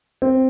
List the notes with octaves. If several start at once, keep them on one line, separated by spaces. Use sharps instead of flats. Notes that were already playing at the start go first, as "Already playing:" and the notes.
C4